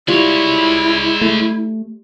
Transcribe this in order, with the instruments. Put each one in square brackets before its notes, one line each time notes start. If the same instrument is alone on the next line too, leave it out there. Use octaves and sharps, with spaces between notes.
[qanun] G3 F4 [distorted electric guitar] G#3 C#5 [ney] E4
[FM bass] A3